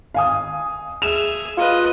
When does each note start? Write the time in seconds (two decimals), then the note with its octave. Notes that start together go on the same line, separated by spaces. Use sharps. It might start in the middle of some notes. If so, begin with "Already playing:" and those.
0.14 F5 G#5 D#6
1.02 G#4 E5 E7 F7
1.57 F4 B4 D#5